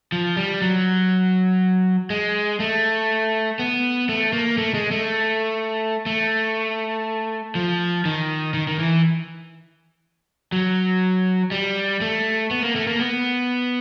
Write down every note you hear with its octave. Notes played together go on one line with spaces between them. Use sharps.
F3
G3
F#3
G#3
A3
B3
A3
A#3
A3
G#3
A3
A3
F3
D#3
D#3
D#3
E3
F#3
G3
A3
B3
A#3
A3
A#3
B3